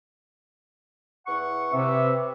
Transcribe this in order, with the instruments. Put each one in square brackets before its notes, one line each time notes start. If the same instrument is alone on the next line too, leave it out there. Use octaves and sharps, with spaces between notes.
[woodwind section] E2 F#5 C#6
[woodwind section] C3 [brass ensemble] C4 B4 E5